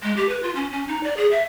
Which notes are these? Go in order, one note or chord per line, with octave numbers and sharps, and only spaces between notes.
G#3
G4
B4
F4
C#4
C#4
D#4
D5
G#4
E5